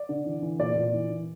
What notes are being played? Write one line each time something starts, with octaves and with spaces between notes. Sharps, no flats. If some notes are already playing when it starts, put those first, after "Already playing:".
Already playing: D5
D3
E3
E3
A#2 D5
A#2
E3
E3